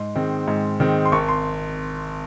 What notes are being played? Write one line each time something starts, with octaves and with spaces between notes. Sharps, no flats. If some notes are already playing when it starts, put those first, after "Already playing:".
Already playing: G#2 C6
D#3 G#3 C4
G#2
D#3 G#3 C4
C6
G#1 C#6
C6